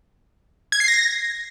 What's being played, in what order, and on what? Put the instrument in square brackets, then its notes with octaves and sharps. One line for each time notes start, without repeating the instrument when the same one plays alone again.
[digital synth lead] G#6
C7
A#6